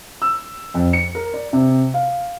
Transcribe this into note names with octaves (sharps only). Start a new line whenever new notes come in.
E6
F2
C#7
A#4
D5
C3
F5